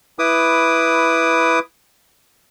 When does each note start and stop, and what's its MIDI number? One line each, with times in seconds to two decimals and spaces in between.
0.19 1.59 64
0.19 1.59 71
0.19 1.59 86
0.19 1.59 87